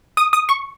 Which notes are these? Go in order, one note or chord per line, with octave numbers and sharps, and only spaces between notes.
D#6
D#6
C#6